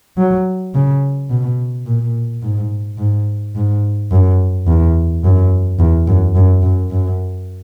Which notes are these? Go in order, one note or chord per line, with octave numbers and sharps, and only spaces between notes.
F#3
C#3
B2
A#2
G#2
G#2
G#2
F#2
E2
F#2
E2
F#2
F#2
F#2
F#2